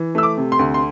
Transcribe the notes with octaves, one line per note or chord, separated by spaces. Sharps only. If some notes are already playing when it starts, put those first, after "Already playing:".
Already playing: E3
A3 E6
D6
C3
C6
D2
C6